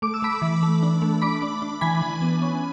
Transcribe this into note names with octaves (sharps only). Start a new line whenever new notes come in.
A3 D6
E6
A3 B5 D6
E3
A3
D4
A3
D4 B5 D6
D4
D4
E3 G#5 B5
E3
B3
C#4